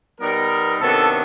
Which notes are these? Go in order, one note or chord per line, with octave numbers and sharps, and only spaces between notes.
B2 G3 B3 D#4 A#4
C3 D#3 F#3 B3 D4 A4